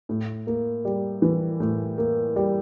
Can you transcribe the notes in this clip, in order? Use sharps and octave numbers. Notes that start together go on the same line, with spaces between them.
A2
A#3
G3
E3
A2
A#3
G3